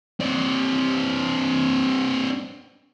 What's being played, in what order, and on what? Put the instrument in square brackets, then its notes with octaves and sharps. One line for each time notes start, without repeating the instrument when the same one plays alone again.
[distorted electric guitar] C4 D4